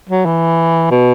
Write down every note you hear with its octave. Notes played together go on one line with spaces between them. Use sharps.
F#3
E3
B2